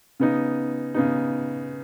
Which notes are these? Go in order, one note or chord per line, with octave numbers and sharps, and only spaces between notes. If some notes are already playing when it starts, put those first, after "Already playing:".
C#3 B3 D#4
C#3 B3 D#4